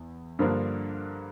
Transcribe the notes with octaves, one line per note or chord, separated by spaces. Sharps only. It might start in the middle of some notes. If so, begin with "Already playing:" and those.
Already playing: E2
G2 D3 F3 A#3 D4